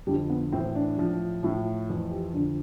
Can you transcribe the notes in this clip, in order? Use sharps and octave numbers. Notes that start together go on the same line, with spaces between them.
F2 D3 F3 G3
B3
A2 E3 C4
D4
A2 F3
A2 F3
F2 E3
G4
F2 D3 F3 D4